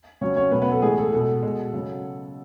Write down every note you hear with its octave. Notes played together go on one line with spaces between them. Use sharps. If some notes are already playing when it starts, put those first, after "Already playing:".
C#3 F#3 C#4 C#5
C#4 C#5
B2 F#3 B3 B4
B3 B4
A4
A2 E3 G#3 G#4
A4
B2 G#3 A4
B2 G#3
C#3 F#3